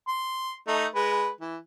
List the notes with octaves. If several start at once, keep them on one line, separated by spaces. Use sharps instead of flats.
C6
A3 D#4
G#3 B4
E3